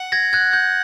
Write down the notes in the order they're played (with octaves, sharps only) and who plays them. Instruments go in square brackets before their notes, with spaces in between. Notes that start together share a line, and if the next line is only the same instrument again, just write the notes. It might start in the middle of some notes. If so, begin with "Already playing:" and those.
Already playing: [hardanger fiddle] F#5
[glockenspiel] G#6 A#6
F#6 G#6
G6